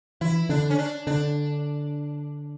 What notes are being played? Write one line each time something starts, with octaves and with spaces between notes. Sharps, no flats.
E3 E4
D3 D4
C#4
D4
D3 D4